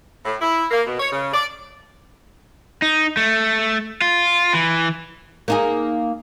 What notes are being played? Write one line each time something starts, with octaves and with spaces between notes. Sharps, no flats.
A2
E4
A#3
B2
C#5
C#3
D5
D#4
A3
F4
E3
A#3 D#4 G#4